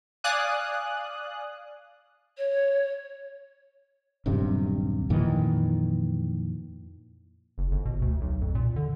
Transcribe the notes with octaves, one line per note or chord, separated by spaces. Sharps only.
D5 F5 G#5 D#6 F#6
C#5
D#1 B1 G2 C3
F2 A#2 D#3 E3
F#1
G1
B2
D2
B1
F2
A#2
D3